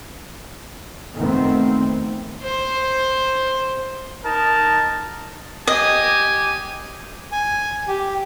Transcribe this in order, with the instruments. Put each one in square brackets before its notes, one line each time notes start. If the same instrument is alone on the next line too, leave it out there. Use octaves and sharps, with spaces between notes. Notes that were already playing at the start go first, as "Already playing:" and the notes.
[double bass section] F2 D#3 A3 B3 C4
[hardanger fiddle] C5
[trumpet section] D#4 A#4 A5
[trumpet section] G4 G#5 [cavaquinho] D#5
[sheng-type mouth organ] G#5
G4